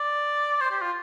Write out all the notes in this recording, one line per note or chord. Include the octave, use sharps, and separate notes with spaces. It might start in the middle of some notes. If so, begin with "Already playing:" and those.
Already playing: D5
C5
G4
F4